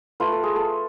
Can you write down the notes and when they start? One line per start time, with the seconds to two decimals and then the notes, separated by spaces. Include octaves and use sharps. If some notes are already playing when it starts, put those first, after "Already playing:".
0.20 A3 F4 B4
0.32 A4
0.43 G#4
0.56 A4